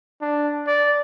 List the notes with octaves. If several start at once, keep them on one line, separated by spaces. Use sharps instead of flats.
D4
D5